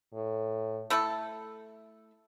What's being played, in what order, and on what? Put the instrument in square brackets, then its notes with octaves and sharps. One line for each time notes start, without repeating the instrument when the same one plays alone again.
[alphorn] A2
[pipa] A3 E4 A4